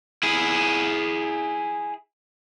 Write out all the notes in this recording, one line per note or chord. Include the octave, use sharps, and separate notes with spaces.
E4 G#4